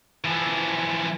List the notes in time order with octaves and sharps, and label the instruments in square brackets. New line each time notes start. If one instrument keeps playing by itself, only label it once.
[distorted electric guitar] E3 F3